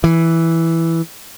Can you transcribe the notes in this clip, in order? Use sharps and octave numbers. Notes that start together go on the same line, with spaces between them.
E3